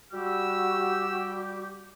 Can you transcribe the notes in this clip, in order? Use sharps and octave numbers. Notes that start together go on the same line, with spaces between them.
G3 F#4 G4 E6